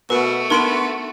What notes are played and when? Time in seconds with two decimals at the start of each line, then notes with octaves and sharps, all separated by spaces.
0.10 B2 A3 F#4 A#4 B4
0.50 B3 D4 D#4 A#4 B5 C6 D7